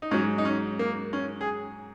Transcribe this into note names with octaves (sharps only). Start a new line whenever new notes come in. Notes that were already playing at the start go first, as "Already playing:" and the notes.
D#4
G#2 F#3 C#4
D#4
C#4
A#3
C#4
G#4